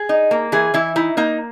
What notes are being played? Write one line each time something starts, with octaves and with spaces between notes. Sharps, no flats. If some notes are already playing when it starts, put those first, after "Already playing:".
Already playing: G#4
D#4
A#3
E3 G#4
E3 E4
D#4 E4
A#3 D#4